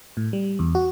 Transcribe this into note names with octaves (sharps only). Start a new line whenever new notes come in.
A2
G3
E2
F#4